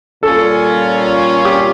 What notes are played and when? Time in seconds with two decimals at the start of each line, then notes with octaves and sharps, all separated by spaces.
0.23 A#2 G3 C#4 F4 A4
1.45 G4